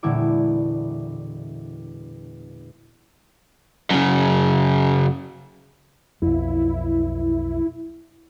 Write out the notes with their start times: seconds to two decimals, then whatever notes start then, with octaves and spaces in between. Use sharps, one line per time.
0.03 E1 A#2 D3 E4 A4 D6
3.90 F#2 C#3
6.22 B1 F2 E4